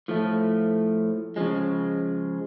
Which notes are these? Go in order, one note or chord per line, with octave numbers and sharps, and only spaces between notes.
A2 F3 A3
C#3 F3 G#3